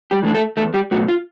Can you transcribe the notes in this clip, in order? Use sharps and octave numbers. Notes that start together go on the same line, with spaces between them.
G3 G4
E3 A3 D4
A3 A4
E2 A3 A4
G3 G4
B2 F#3 A3 F#4
F4